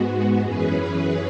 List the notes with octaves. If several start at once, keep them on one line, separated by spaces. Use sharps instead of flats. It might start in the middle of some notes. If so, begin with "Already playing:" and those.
Already playing: G#2 G#3 B3 F#4
F#2 E3 C#4 G#4 B4